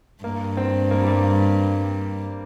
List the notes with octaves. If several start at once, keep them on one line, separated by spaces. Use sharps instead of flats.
G2 A#3
C4
A#3
G3
A#3